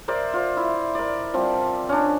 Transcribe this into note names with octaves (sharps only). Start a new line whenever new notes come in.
A#4 C5 D5 E5
F4 C5
E4
A#4 D5
F3 G3 C4
C#4 D4